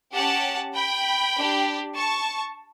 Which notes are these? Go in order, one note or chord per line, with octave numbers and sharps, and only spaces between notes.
C#4 G4 F#5 A5
G5 B5
D4 G4
A5 C#6